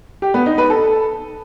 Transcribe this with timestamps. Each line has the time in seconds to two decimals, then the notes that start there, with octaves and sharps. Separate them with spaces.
0.22 G4
0.34 B3
0.46 D#4
0.58 B4
0.70 A4